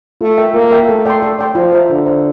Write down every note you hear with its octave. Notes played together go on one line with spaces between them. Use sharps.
A3 F4
A#4 E5 G5
A#3 F4
A#4 E5 G5
A3 A4
D5 G5 C6
A4
D5 G5 C6
F3 F4
C5 E5 A#5
D3 F4
C5 E5 A#5